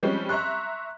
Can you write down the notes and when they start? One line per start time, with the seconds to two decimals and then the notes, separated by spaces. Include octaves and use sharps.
0.03 F3 G3 G#3 C4 C#4 G4
0.29 E5 A#5 C6 C#6 F#6